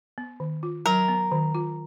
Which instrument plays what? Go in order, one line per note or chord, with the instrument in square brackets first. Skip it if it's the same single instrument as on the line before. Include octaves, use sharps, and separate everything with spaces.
[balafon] B3
D#3
F4
[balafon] F#3 [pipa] A#4
[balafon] B3
D#3
F4